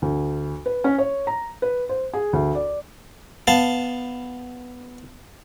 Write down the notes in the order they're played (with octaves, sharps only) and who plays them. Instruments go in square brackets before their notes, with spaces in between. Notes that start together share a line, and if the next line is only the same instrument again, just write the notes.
[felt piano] D2
B4
C#4
C#5
A#5
B4
C5
G#4
D2
D5
[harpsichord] B3 F5 A5